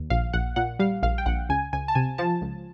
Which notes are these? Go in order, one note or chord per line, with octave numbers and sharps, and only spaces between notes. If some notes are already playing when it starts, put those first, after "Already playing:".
Already playing: D#2
A#1 F5
A#1 F#5
A#2 F#5
G3 F5
A#1 F5
G5
A#1 F#5
C#2 G#5
C#2 G#5
A5
C3 G#5
F3 A5
C#2